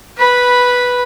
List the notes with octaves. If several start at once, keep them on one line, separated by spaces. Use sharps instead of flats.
B4 B5